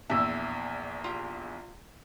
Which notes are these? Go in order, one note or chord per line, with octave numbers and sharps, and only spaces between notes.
A#1 E2 E5
F4 G4